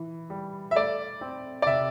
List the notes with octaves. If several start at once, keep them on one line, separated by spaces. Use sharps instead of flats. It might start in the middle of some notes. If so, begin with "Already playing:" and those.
Already playing: E3
G3
E5
A3 D5
C4
D5
C3 E5